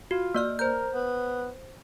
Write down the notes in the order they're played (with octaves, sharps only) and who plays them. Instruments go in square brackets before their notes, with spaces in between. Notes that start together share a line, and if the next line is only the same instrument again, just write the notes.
[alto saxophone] F4 [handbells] F#4
[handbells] A#3 D5 F6
[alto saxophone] A#4 [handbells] C5 G6
[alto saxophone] B3